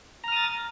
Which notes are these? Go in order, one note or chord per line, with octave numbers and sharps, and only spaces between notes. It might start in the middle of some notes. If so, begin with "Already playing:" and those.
A#5 D#6 F6 A6